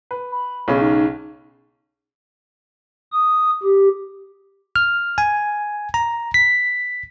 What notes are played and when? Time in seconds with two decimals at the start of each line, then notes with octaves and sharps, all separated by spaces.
0.11 B4
0.32 B5
0.68 B1 C#3 C#4
0.81 D#4
3.12 D#6
3.63 G4
4.76 F6
5.18 G#5
5.94 A#5
6.34 B6